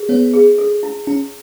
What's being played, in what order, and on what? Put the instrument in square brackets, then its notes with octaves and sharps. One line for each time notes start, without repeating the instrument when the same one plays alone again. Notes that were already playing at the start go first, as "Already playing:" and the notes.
Already playing: [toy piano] G#4
[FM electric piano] B3 [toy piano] C#5
[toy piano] G#4
A4
E4
[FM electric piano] C#4 [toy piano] E4